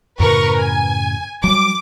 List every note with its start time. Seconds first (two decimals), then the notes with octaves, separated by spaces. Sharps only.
0.20 F#2 A2 C#3 A#4 B4 C#6
0.58 G#5
1.44 F#3 G3 D6